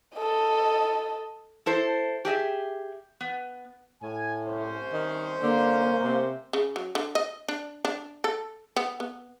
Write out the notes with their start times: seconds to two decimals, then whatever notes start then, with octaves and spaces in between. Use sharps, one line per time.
0.16 A4 D#5
1.66 E4 A4 C5
2.25 G4 G#4 D#5 E5
3.21 B3
4.02 A2 G#5
4.46 C2 C#4 C5
4.93 D#3
5.42 D3 A#3
6.02 C3
6.53 C#3
6.76 F#3
6.95 D3
7.15 D#5
7.48 D4
7.85 D4
8.24 A4
8.76 B3
9.00 B3